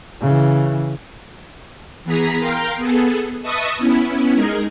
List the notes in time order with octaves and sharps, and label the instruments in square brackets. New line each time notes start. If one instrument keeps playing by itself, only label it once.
[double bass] C#3 E3
[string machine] E3 B3 G#4 A#5 B6
A#4 F5 G5 A#5 C6
B3 G#4 A4
B4 D#5 E5 A5 C#6 D#6
B3 C#4 E4
G#3 D#4 G#4 A#4